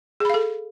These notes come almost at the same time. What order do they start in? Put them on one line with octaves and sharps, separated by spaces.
G#4 B5 F5 A4